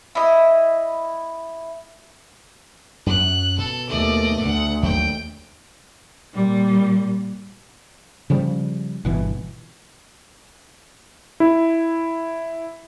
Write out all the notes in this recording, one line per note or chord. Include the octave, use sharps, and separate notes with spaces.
E4 D#5
F#2 F#3 F#6
B2 A4
D#2 A3 D5 D#5
D2 F#5
D#2 F#3 G5
A#2 G3
C#3 F3 G3
G1 B2 E3
E4